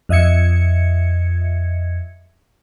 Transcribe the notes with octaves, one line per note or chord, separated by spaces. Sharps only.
F2 D#5 E5 G#6 C#7